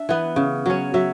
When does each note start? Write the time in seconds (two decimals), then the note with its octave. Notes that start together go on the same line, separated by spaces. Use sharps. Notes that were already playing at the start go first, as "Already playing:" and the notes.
Already playing: D4 E5
0.09 E3 B3
0.36 C#3
0.66 F#3 C#4
0.94 F#3 E5